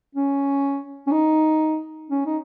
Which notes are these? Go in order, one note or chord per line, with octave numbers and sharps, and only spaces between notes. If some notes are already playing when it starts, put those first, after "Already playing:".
C#4
C#4
D#4
C#4
D#4